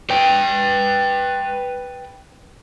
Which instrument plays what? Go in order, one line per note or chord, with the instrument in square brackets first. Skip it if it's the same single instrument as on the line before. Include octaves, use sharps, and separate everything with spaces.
[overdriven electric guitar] B4 G5